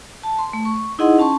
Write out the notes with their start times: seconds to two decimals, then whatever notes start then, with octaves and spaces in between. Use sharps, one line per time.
0.23 A5
0.39 C6
0.53 A3
0.65 C#6
0.99 D#4 E4 G#4 D#5 F#5 C6
1.19 C#4 A5 C6 C#6